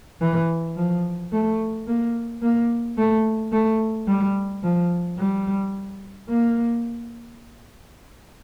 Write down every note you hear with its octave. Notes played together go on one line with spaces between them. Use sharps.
E3
F3
A3
A#3
A#3
A3
A3
G3
F3
G3
A#3